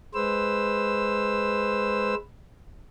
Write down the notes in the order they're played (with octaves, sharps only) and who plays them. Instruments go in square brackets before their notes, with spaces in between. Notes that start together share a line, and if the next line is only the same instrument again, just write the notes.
[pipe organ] G#3 B4 C5 E6